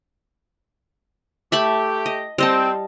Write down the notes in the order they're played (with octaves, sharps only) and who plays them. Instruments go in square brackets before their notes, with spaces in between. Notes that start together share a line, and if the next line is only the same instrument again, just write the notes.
[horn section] A3 G4 [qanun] E5 A5 B5
[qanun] D#5
[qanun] G3 D#5 A5 [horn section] C4